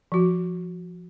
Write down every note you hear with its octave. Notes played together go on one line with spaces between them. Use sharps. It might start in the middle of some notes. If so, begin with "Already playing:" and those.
F3 F#4